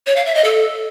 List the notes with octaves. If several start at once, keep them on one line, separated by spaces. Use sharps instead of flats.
C#5
F5
E5
D#5
A4